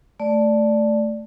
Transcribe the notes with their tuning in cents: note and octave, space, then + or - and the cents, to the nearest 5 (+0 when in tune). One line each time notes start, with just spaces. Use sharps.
A3 +0 D5 +0